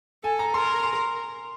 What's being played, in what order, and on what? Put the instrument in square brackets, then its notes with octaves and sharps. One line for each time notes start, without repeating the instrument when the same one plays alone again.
[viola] A4 [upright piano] G#5
[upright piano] A#5
[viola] A#4 [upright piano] C6
[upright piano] C6